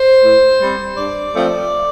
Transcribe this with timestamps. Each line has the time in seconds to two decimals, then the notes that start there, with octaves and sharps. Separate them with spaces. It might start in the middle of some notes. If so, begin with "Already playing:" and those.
Already playing: C5
0.24 A2
0.61 G3 C4
0.98 G2 D5
1.35 F3 A3 C4